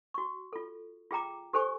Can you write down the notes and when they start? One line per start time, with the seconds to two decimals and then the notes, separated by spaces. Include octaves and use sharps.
0.14 F#4 C#6
0.53 F4 A4
1.11 F4 G#4 G5 A#5 D6
1.53 G4 A4 C5 G#5 C#6